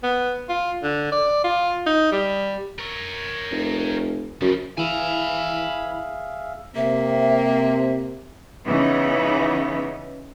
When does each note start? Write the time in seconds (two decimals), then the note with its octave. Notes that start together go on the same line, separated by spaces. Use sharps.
0.03 B3
0.49 F4
0.83 D3
1.12 D5
1.44 F4
1.87 D#4
2.12 G3
2.78 A#4 C#5
3.51 F1
4.41 F#2 C#3 F3
4.77 E3 G#4 E5 F5 G#5 B5
6.76 C3 A#3 E5
8.65 C#3 E3 B3 D#4